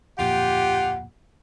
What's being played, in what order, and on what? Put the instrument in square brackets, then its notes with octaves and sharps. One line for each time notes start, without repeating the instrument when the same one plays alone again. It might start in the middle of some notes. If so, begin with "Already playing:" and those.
[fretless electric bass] D1 F2 A#2 [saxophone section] F4 G4 [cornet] F#5